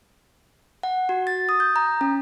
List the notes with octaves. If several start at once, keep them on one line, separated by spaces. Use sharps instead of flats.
F#5
F#4
A6
D#6
G6
A#5
C#4